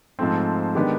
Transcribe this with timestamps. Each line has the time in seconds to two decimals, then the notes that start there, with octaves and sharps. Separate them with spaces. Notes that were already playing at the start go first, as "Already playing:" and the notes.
0.19 G#2 F3 A3 C4
0.75 D#3 G#3 B3 D4 G4